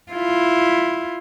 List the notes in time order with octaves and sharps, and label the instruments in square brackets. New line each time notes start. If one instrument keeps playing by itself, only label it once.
[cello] E4 F4